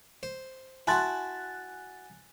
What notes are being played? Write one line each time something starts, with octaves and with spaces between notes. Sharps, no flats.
C5
E4 F#4 G#5 A5 B5 C6 F#6 A6